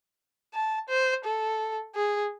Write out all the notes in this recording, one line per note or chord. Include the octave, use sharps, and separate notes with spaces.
A5
C5
A4
G#4